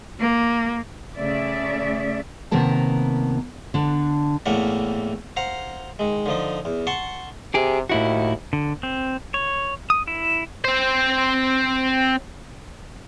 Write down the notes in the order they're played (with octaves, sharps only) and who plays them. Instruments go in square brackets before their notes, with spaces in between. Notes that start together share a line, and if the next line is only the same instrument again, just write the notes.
[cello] A#3
[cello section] C#3 A3 D5 E5
[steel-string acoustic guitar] C3 D#3 A#3 B3 A#4 A5
D3 D4
[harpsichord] E2 A2 E3 A3 A#3 F#5
C5 F5 F#5 A#5
D#3 G#3
D3 F3 D#4
E2
F#5 A5 C6 C#6
[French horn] C3 [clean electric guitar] G4 G#4
[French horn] D#2 [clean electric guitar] A2 E4 F#4
[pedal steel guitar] D3
C4
C#5
D#6
E4
[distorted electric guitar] C4 C5